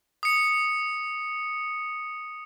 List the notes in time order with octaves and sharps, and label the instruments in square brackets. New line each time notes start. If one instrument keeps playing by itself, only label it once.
[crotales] D#6 C#7